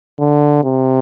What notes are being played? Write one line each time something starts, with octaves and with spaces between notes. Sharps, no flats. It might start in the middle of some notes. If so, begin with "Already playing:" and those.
D3
C3